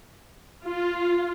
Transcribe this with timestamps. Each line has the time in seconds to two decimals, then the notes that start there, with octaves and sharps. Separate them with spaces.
0.64 F4